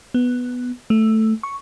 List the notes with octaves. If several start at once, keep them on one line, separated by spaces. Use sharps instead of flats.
B3
A3
C#6